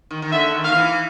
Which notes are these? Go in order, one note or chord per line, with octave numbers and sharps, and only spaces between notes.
D#3
D#3
D3 E5
D#3
F5
D#3
E3